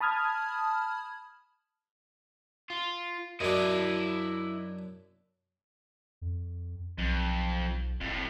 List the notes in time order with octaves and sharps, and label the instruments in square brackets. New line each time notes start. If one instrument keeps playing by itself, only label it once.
[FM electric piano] A5 B5 D#6 F6 G#6
[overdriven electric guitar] F4
[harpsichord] F#2 D4 [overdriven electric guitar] E4 D#5
[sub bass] F2
[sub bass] B1 [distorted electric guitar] F2
[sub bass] F#1 [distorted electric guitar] F2 A2